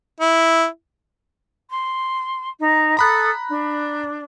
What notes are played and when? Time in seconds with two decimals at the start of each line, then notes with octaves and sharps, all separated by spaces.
0.20 E4
1.68 C6
2.59 D#4
2.97 A4 A#5 B5 D#6 F#6
3.48 D4